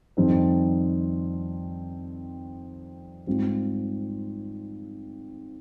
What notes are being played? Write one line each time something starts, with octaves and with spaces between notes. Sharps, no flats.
F2 D#3 G3 C4 D#4
G#2 G3 C4 F4